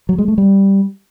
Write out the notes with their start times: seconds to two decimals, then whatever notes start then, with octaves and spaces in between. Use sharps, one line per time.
0.09 F#3
0.18 G#3
0.28 A3
0.38 G3